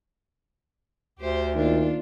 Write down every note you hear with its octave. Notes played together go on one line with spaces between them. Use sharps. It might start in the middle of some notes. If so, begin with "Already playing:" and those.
D2 G4 C5
D#3 A#3 D4 F4